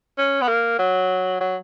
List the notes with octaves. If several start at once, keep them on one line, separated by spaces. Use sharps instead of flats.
C#4
B3
A#3
F#3
F#3